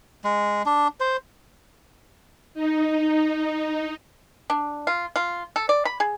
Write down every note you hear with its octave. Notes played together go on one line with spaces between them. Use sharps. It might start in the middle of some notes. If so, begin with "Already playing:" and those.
G#3
D4
C5
D#4
D4
F4
F4
A4
D5
B5
G#4